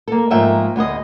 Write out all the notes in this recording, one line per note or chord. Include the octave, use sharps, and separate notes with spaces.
A#3 A4
G#2 F3 A3 A#3 E5 G5
D2 B3 G#4 D#5